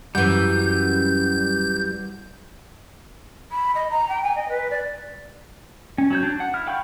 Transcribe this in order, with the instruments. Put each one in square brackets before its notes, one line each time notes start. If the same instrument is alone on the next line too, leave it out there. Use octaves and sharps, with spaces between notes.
[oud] F#2 E3 [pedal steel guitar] G3 [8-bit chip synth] G6
[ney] B5
D#5
A#5
G5
G#5
D#5
B4
D5
[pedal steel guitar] C#4
F#3 C#5 G6
D4
F#5
E4 F6
F5 G5 B5 C#6 G6